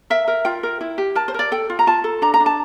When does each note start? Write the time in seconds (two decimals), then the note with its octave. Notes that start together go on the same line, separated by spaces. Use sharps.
0.10 A#4 E5
0.28 A#4
0.45 F4 G5
0.63 A#4
0.81 E4
0.98 G4
1.15 A#4 A5
1.28 C5
1.34 A#4 D5
1.52 A4 G5
1.70 F4
1.79 A#5
1.87 F4 A5
2.04 A4
2.22 D4 A#5
2.34 A#5
2.40 D4
2.46 A5